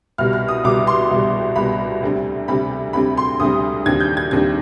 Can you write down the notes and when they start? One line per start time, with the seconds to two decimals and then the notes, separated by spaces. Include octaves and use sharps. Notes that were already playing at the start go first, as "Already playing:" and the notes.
0.18 C2 B2 G3 F6
0.33 F6
0.48 D#6
0.64 C2 B2 G3 D6
0.87 C6
1.11 C2 B2 G3
1.56 C2 B2 G3 B5
2.03 D2 C3 G3 C4
2.48 D2 C3 G3 C4 B5
2.93 D2 C3 G3 C4 B5
3.17 C6
3.40 D2 C3 G3 C4 D#6
3.86 D#2 D3 G3 C4 G#6
4.00 G6
4.17 G#6
4.31 D#2 D3 G3 C4 G#6